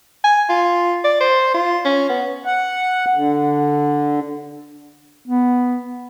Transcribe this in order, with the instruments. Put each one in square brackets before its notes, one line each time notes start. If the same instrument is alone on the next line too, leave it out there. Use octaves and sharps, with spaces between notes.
[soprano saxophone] G#5
F4
D5
C5
F4
C#4
B3
[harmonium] F#5
D3
[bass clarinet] B3